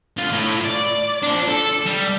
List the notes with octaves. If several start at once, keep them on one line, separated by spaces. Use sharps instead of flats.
D3 F4
A2
D5
F3 D4
A4
G3